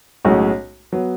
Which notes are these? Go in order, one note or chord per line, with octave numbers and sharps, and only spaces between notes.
B1 A2 G#3 C#4 F#4
F#3 B3